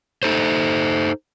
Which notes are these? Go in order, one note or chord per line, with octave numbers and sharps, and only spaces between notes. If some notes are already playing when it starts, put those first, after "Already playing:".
D#4 A4 C5